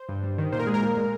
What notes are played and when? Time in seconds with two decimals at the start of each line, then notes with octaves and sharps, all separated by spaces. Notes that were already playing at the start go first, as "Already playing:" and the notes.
Already playing: C5
0.09 G2
0.23 G3
0.38 D#3
0.52 A#2 C5
0.59 A#4
0.67 G#3 G#4
0.74 A#4
0.81 A#2
0.97 G#3